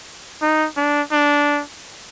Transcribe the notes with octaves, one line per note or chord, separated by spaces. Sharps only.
D#4
D4
D4